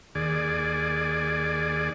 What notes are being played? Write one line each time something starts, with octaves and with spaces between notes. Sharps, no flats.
D#2 G#4 D5